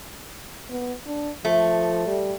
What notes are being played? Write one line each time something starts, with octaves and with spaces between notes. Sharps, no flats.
B3
D4
F3 A3
G3